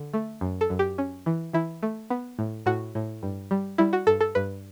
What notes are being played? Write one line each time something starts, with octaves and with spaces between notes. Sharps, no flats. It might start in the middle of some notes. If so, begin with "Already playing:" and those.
Already playing: D3
A3
F#2
A4
F#2
G4
C#4
E3
E3 E4
A3
B3
A2
A2 F#4
A2
G2
G3
G3 E4
F#4
G2 A4
A4
G2 B4